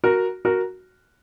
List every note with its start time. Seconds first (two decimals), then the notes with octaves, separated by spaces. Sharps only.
0.04 F#4 A#4
0.45 F#4 A#4